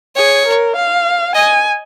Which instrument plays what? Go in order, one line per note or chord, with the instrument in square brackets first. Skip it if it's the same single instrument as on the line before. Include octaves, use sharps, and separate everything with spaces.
[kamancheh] G#4 [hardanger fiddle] C#5
[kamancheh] A#4
F5
[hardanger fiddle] D#5 [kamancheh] G#5